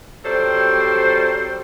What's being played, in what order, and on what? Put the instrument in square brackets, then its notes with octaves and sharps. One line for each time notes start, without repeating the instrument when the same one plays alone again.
[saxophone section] F#3 G3 C4 A4 C5